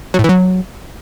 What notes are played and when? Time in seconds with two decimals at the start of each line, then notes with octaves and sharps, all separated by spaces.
0.14 F#3
0.19 A2
0.24 E3
0.29 F#3